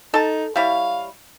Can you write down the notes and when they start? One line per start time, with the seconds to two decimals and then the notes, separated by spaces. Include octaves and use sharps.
0.14 D#4 A4 A5
0.56 G3 E4 C#5 F5